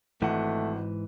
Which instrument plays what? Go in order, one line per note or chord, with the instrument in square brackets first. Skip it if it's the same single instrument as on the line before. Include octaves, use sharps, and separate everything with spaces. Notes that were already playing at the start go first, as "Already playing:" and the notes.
[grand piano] G#1 F#5 [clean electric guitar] G#2 E3 [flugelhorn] A3